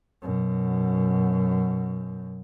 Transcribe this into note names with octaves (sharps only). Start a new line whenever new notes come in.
F#2 B2